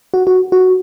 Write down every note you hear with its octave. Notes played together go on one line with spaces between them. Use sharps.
F#4
F#4
F#4